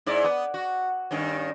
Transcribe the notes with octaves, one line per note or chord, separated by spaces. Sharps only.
G#2 E4 D5
B3
F#4
G2 D#3 C#4